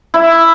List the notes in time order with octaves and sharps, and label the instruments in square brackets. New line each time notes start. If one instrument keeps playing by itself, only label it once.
[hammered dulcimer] E4